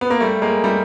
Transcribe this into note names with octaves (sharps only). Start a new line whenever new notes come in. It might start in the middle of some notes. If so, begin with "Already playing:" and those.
B3
A#3
G3 A3
G#3 A#3
G3 A3